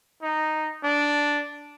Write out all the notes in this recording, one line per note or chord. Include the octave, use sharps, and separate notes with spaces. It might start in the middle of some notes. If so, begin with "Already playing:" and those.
D#4
D4